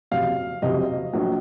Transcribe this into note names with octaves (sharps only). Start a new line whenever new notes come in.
F#1 F2 C3 F#3 F5
F#1 F2 C3 F#3 D#5
A#1 A#2 F#3